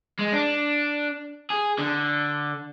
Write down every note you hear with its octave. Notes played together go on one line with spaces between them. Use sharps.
G#3
D4
G#4
D3